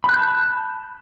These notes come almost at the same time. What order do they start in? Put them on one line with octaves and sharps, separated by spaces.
B5 F#6 G6 A5